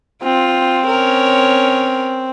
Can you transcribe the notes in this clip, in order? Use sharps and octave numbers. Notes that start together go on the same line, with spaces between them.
C4 F4
C#4 A#4 C#5